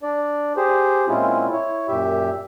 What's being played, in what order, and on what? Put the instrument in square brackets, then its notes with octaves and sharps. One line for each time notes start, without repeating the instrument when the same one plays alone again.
[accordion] D4 D5
G4 G#4 C5
A#2 G#3 C4 C#4 E4 F4
E4 C#5
F#2 A#2 G4 E5